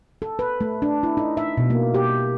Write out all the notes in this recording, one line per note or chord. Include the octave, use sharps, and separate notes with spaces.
A4
B4
A3
D4
E4
D#4
E5
B2
A#3
G4